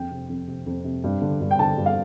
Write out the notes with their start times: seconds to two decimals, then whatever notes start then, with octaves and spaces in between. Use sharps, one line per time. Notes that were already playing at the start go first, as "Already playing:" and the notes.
Already playing: F2 G5
0.11 C3
0.29 F2
0.47 C3
0.66 F2
0.84 C3
1.04 G2
1.22 D3
1.41 G2
1.51 G5
1.59 D3 A5
1.77 G2
1.86 F5